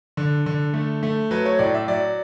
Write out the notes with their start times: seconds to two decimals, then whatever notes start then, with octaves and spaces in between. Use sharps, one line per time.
0.17 D3
0.46 D3
0.74 A3
1.03 A3
1.31 F#3 B4
1.46 C#5
1.59 A2 D5
1.74 E5
1.88 F#3 D5